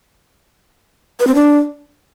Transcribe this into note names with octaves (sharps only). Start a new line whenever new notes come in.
B4
C4
D4